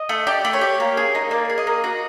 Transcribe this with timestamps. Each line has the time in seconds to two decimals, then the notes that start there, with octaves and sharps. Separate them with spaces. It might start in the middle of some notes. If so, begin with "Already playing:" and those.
Already playing: D#5
0.09 A3
0.27 G4 D5
0.45 A3
0.53 C#5
0.61 G4
0.80 A#3
0.97 G#4
1.15 D#4
1.31 A#3 D5
1.50 G#4
1.58 D#5
1.67 A#3
1.84 F#4